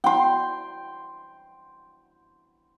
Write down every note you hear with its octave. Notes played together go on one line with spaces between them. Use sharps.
G5 C6